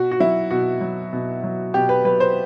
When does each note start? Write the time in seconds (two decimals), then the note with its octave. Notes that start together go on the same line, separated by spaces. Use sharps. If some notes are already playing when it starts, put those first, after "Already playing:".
Already playing: B2 F#4
0.11 F#4
0.20 F#3 E4
0.51 B2 F#4
0.81 F#3
1.13 B2
1.44 F#3
1.74 B2 G4
1.89 B4
2.05 F#3 B4
2.20 C5